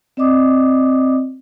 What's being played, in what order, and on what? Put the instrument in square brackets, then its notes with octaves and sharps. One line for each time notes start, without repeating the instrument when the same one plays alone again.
[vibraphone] C4 D5 D#5 D6 D#6